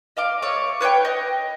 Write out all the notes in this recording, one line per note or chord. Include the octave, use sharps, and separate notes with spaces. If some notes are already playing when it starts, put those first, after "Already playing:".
D#5 F5 D6
A3 C#5 D6
B4 C#5 F#5 G5
D#5